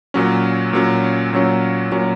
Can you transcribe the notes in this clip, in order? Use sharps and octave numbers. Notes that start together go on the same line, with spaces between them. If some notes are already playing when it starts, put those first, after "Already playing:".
A#2 F#3 C#4
A#2 F#3 C#4
A#2 F#3 C#4
A#2 F#3 C#4